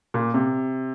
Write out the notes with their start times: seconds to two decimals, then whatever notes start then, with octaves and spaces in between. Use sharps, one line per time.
0.14 A#2
0.34 C3